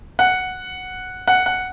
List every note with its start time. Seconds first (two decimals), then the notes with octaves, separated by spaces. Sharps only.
0.19 F#5
1.28 F#5
1.46 F#5